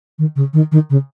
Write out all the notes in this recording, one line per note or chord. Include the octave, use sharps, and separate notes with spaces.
D#3
C#3
D#3
D#3
C#3